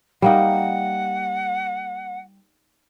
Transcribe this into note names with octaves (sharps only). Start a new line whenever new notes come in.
G3 A#3 D#4 F#5